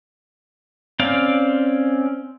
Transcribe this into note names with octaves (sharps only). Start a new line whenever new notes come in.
C4 C#4 D5 F5